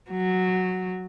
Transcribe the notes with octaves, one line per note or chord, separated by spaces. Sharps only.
F#3